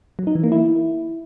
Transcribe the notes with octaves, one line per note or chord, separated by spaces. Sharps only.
F#3
D#4
E3
A#3
E4